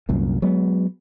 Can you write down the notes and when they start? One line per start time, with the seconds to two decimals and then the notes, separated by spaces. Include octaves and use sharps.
0.09 C2 F#2 A#2
0.42 F#3 G#3 B3